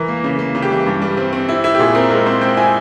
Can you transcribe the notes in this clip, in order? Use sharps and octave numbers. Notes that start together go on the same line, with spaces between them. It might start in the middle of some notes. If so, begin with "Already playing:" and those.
Already playing: E3 A#4
A#3
C#3
A#3
C#3
G4
E3
G2
G3
C4
C4
E4
E4
G4
A#2 G#4
C4 A#4
G#3 A#4
C4 C5
C4 G5
E4 G#5